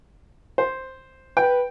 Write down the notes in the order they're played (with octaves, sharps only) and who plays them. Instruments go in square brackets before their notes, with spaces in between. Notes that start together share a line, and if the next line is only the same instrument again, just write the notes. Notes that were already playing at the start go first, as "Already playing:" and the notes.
[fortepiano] C5
[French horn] B4 [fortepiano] G5